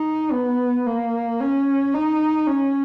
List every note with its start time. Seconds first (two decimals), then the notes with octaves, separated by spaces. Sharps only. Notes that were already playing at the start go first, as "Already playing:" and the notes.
Already playing: D#4
0.32 B3
0.87 A#3
1.40 C#4
1.94 D#4
2.47 C#4